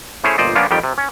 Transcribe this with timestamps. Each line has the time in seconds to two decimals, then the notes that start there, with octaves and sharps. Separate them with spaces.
0.24 A3 C#4 E4 G#4 C5 C#5
0.38 G1 A#2 C5 D5 D#5
0.55 F3 A#3 B3 C#4 D4 F4
0.71 F2 D#3 G3 G4 G5
0.83 C3
0.98 C#4